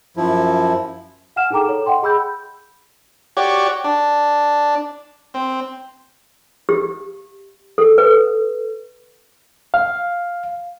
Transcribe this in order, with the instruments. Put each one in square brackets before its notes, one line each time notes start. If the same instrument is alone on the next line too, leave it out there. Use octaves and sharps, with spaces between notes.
[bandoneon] F#2 F3 E4
[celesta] F5 F#5 G#5 F6 E7
D#4 G#4 A4 G5 A#5 D6
A4 C#5
D#5 F#5 G5 C6
G#4 B5 E6 G6
[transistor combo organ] F#4 G4 C#5 D5
D4
C4
[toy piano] G4
A4
B4
[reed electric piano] F5